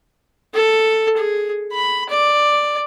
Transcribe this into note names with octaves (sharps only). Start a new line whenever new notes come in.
A4
G#4
B5
D5